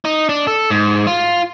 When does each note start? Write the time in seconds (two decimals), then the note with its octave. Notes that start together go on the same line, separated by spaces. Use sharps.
0.05 D#4
0.29 D4
0.47 A4
0.70 G#2
1.07 F4